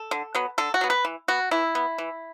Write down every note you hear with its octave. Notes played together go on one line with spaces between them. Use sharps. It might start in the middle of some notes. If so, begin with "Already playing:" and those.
Already playing: A4
D3
F#3 B3
D3 A4
F#4
F#3 B3
B4
E3
B3 F#4
E3 E4
B3
E3